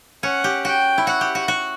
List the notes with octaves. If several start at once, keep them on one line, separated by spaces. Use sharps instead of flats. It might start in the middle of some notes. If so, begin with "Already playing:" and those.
C#4 F#5
G4
F#4 G5
E4
F#4 F#5
G4
F#4
F#4